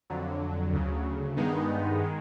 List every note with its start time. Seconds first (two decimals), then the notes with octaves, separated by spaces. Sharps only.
0.10 F2 D3 F#3
0.73 D2 C#3 F#3
1.37 G2 D#3 G#3 B3 D#4
2.03 D#3 G#3